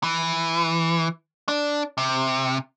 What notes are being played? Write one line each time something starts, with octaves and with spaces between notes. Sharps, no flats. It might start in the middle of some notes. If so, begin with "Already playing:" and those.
E3
D4
C3